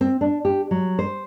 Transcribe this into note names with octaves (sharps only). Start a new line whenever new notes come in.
C4
D4
G4
F#3
C5